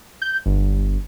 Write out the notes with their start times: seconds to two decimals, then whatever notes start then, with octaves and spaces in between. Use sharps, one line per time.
0.22 G6
0.46 G1